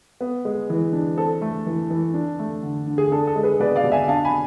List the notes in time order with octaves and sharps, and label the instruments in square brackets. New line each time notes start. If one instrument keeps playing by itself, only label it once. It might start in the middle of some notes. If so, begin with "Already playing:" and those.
[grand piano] B3
G#3
E3
D4
C4 A4
A3
E3
E3
D4
A3
D3
D3
G#4
D4 A4
A4
G#3
G#4 B4
B2 B4 D5
D5 F5
B2
E5 G#5
D4 F5 A5
G#5 B5